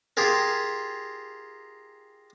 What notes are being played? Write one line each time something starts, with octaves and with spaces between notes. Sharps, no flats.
F4 G4 G#4 A#4